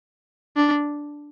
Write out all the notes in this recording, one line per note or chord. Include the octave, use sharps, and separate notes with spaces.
D4